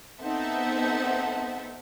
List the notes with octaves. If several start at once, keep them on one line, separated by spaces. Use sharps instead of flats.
B3 C4 D#4 A4 E5 F#5